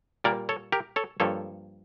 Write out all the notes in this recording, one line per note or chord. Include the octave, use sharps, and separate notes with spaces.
A#2 G3 A#3 A#4 D5
A4 C#5
G4 A#4
A4 C#5
G2 F3 A#3 A4 C#5